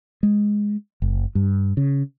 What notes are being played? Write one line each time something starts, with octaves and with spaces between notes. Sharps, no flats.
G#3
F#1
G2
C#3